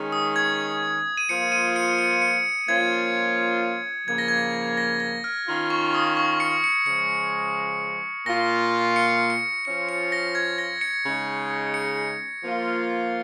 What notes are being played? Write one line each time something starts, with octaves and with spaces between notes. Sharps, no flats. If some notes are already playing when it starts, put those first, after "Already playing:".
Already playing: D#3 G#3 C#4
D#6
G#6
D#7
F3 A#3 F4 C#7
D#7
C#7
C#7
C#7
F3 A#3 C#4 F4 G#6
C#3 F3 A#3 G#6
A#6
G#6
A#6
A#6
F6
D#3 C#4 F4
C#6
D#6
C#6
C#7
C#7
C#3 F3 G#3 C#7
A#2 A#3 F4 A#6
C#7
C#7
F3 C#4 F4 C#7
C#7
A#6
G#6
A#6
C#7
C#3 G#3 D#4
C#7
F3 A#3 F4